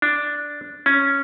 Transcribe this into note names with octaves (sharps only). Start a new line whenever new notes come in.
D4
C#4